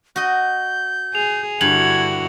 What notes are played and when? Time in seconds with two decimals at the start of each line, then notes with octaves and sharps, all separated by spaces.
0.16 F#4 D#5 G6
1.15 G#4 F7
1.61 G2 D3 E4 F#4 G#6 F#7